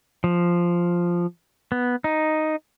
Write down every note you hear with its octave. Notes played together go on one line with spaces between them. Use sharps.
F3
B3
D#4